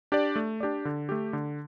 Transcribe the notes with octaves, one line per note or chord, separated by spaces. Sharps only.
D4 G4 D5
A3
D4 G4 D5
D3
A3 G4
D3